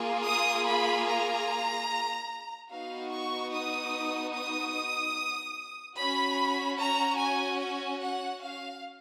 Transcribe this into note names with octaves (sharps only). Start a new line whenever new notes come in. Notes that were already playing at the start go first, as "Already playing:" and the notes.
Already playing: A#3 F4 G#4
D#6
B5
A#5
B3 D#4 F#4 F5
C#6
D#6
D#6
C#4 F#4 B5
A#5
G#5
G#5
F#5
F5